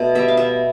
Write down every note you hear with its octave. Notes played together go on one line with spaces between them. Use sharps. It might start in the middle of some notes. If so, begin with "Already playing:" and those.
Already playing: B2 A3
G3 B3 E5
F5
B2 E5